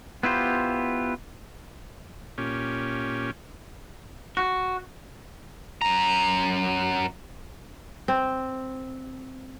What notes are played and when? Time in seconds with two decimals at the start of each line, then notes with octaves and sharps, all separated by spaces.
0.23 B3 E4 F4 G4 C5
2.38 A#2 C#4 G4
4.37 F#4
5.82 F#2 A#5
8.08 C4